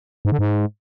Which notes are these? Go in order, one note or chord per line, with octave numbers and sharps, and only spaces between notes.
G#2
D3
G#2